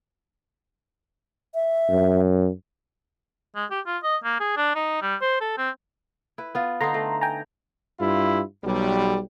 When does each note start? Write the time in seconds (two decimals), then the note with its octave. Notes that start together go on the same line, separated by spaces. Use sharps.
1.54 E5
1.90 F#2
3.55 G#3
3.70 G4
3.86 F4
4.03 D#5
4.24 A#3
4.40 G#4
4.57 D4
4.75 D#4
5.02 G3
5.21 C5
5.41 A4
5.58 C4
6.38 E4 B4
6.55 B3 F4
6.81 D3 D#4 A#5 C6
6.94 A3
7.21 G5 G#5 A#5
8.00 G2 E4 F4
8.64 B1 G3